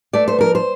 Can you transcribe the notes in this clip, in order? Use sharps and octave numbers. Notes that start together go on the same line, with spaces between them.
A3 D5
C5
F3 A#4
C5